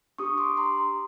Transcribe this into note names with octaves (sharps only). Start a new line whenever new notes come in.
D4 G4 C#6 D#6
C6 D6
A#5 C6
C6 D6